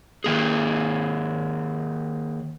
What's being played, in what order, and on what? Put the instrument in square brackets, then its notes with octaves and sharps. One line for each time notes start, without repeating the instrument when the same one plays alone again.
[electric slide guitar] D#3 A#3 G#4